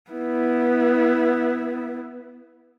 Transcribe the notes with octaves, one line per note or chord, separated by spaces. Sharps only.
B3 E4